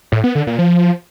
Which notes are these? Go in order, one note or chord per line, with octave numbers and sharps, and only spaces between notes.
A2
B3
D3
A#2
F3